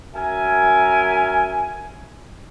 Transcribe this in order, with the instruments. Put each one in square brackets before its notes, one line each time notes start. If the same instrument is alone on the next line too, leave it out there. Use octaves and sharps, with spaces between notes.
[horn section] F#2 A#4 E5 G#5